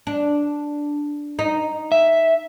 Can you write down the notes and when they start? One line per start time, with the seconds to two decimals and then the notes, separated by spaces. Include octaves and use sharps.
0.07 D4
1.39 D#4
1.92 E5